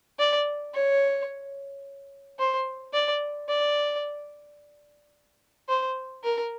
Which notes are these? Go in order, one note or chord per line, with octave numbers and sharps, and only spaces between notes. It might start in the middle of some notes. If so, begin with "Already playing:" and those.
D5
C#5
C5
D5
D5
C5
A#4